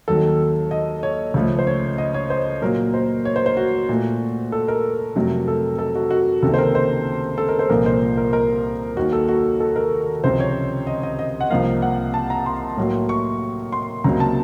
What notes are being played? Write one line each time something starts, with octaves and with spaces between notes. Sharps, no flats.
D#2 D#3 F#3 A4
D#5
C#5
C#2 C#3 F3 A3
C5
C#5
D#5
C#5
C5
A#2 F#3 A#3 A#4
C5
C#5
C5
C5
F#4
A#2 A3
A4
A#4
F2 C3 F#3 A3
A4
A4
F#4
F#4
C#2 C3 D#3 A#3 A4
C5
A#4
C5
A4
A#4
C5
C2 A#2 F3 A#3 A#4
C5
A#4
A#4
D#2 D#3 A#3 F#4
A4
F#4
A4
A#4
C#2 C3 F3 C5
C#5
D#5
D#5
D#5
F#5
C2 C3 F3 A#3 F5
F#5
A5
A#5
C6
A2 F#3 A#3
C#6
C6
C#2 C3 F#3 A#3 A#5
A5